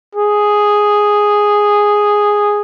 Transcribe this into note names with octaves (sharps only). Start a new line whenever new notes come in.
G#4